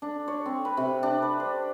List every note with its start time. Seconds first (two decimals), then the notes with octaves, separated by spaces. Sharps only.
0.02 D4
0.28 C#5
0.46 C4
0.65 B4
0.77 C3
1.03 D4
1.22 B4
1.40 C5